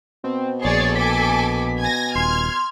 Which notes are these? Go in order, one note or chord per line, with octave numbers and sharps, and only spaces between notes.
B2 C4
A#1 G#4 C#5 D5 A6
A4 G#5 D6 B6
G#5 G#6 A#6
D#1 C6 F6 G#6